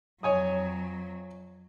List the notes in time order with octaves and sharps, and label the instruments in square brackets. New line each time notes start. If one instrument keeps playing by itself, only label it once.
[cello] F2 F#3 [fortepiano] C#5 G#5 D#6